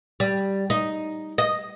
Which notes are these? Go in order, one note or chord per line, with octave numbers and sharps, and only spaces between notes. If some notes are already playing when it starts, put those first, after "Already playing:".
G3
D#4
D#5